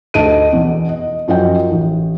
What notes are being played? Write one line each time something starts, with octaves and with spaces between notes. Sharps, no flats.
D2 A3 D#5 A5 D7 D#7
E2 B2 E3
D#5
F#2 F3 C#4 F#4 D#5 G5
A1